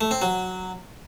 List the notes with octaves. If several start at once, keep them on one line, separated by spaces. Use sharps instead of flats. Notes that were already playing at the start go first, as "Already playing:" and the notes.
A3
C4
F#3